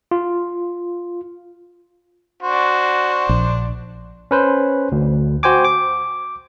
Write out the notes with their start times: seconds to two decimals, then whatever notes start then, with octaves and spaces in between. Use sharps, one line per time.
0.11 F4
2.42 D4 F#4 C5
3.29 A#1
4.31 C#4 B4 C5
4.92 D2
5.43 F#4 C5 G5 G#5 D6
5.64 D6